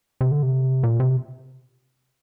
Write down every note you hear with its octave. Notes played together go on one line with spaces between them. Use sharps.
C3
D3
C3
A#2
C3